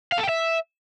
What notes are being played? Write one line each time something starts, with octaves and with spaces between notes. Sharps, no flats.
F5
A4
G5
E5